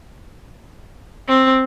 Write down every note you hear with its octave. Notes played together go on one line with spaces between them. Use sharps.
C4